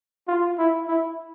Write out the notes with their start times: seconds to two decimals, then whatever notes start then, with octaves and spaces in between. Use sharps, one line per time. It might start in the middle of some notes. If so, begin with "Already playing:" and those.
0.28 F4
0.58 E4
0.88 E4